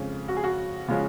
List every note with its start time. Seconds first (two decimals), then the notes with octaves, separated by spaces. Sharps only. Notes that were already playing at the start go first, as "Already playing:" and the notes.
Already playing: F2 C#3 G#3 C#4
0.28 F#4
0.37 G#4
0.44 F#4
0.88 C#3 F3 G#3 C#4